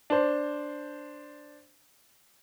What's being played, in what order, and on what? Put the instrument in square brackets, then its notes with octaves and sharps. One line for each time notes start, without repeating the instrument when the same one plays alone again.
[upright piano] D4 C5